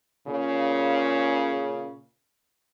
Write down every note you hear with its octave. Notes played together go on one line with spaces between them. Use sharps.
A#2 C#3